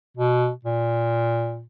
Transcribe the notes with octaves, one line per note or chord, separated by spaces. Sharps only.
B2
A#2